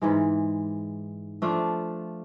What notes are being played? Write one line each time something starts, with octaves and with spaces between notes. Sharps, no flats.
G#2 E3 G#3
F3 A3 D4 F4